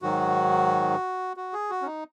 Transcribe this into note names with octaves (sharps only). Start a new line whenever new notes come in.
G#2 D#3 F#3 F#4
F#4
G#4
F#4
C#4
D#4